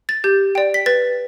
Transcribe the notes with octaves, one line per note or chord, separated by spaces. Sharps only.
A6
G4 G6
D5 G5
B6
B4 A6